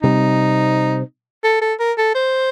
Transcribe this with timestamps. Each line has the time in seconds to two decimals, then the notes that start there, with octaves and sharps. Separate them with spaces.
0.03 C3 G3 C4 D#4
1.44 A4
1.62 A4
1.80 A#4
1.98 A4
2.15 C5